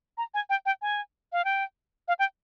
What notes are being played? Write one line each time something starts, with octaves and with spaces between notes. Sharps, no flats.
A#5
G#5
G5
G5
G#5
F5
G5
F5
G5